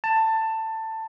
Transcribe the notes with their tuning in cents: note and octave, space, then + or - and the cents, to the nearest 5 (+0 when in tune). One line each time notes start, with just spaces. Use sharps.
A5 +15